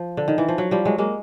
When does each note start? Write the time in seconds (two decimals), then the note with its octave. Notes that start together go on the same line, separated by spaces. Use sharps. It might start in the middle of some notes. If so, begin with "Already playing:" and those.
Already playing: F3
0.17 D3
0.28 D#3
0.38 E3
0.48 F3
0.58 F#3
0.71 F3 G3
0.85 F#3 G#3
0.98 G#3 A#3